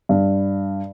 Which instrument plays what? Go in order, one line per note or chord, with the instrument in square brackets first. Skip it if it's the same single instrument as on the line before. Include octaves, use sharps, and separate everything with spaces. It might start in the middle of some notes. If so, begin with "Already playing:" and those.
[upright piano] G2